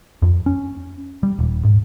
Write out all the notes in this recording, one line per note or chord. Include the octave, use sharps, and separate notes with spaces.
F2
C#4
G3
D#1
G#2